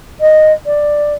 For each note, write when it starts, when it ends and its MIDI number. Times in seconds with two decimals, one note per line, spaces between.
0.20 0.53 75
0.66 1.13 74